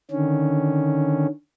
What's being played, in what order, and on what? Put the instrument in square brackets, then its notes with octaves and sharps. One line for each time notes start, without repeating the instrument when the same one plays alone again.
[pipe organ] D3 D#3 C#4